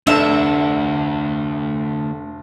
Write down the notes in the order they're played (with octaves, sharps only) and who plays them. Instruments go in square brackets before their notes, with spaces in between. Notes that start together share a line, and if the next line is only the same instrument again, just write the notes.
[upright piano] F1 A4 [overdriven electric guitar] D2 [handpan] D4 [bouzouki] E5